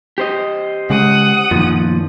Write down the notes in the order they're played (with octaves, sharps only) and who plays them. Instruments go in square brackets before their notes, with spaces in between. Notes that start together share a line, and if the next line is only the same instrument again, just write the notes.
[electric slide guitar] G4 C5 D#5
[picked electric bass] C#3 G#3 [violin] F#5 D#6
[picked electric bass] F#2 D#3 [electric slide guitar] A#2 F3